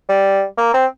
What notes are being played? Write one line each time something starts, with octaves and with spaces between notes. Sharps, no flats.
G3
A#3
C4